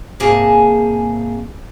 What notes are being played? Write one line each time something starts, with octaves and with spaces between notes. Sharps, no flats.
G#2 C3 A#3 G#4 G#5 A5